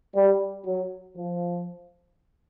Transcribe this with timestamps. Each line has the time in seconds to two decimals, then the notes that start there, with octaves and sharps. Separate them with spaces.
0.15 G3
0.66 F#3
1.16 F3